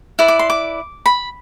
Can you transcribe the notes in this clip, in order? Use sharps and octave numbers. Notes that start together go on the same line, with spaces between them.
E4 B4 D5
D6
C6
D6
B5